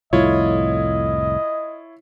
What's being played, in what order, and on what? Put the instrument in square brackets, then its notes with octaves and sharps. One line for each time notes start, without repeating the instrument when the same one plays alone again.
[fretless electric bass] C2 F2 A2 [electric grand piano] E4 F4 C#5 [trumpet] D#5